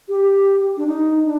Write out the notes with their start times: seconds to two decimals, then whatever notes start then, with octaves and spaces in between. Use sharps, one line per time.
0.09 G4
0.77 D4
0.86 D#4
1.24 D4